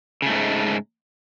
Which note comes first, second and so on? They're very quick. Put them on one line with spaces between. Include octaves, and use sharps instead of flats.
C#3 A3 G#2 G#3